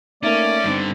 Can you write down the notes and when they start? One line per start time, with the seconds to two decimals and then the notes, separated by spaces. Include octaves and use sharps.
0.23 A3 A#3 C#4 D#4 D5
0.64 G2 D3 C4 D#4